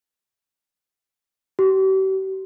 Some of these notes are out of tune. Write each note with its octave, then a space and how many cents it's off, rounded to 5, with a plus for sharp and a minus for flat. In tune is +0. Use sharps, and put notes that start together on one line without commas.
G4 -45